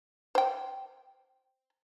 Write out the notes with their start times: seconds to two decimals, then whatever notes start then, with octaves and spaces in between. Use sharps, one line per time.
0.35 C5 G5